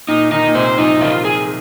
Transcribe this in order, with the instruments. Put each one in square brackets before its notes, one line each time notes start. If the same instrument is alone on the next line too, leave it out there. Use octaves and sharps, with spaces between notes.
[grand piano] A#2 [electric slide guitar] D#4
[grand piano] D#3 [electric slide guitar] D#4
[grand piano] A#2
[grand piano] C3 [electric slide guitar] C5
[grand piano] F3 [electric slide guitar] D#4
[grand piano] C3
[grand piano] D#3 [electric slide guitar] F4
[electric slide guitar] G#4